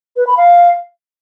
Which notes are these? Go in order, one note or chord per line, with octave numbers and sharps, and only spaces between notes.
B4
B5
F5